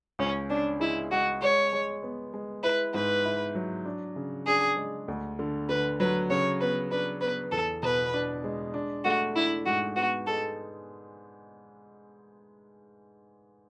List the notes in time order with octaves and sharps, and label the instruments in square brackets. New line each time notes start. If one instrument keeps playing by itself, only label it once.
[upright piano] C#2 [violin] C#4
[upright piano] C#4 [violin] D4
[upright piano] G#3 [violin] E4
[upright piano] G#3 [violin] F#4
[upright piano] G#3 [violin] C#5
[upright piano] G#3
B3
G#3
[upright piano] E4 [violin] B4
[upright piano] G#2 [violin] B4
[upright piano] E4
F#3
D4
C#3
[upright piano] D4 [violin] G#4
[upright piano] G#3
D2
D3
[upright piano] D3 [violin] B4
[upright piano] F#3 [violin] B4
[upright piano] C#3 [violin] C#5
[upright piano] B3 [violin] B4
[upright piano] D4 [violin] B4
[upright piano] B3 [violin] B4
[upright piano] E2 [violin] A4
[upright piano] B2 [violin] B4
[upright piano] D4
G#3
D4
[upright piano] A3 [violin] F#4
[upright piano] D4 [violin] E4
[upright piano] G#2 [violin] F#4
[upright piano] B3 [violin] F#4
[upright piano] G#3 [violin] A4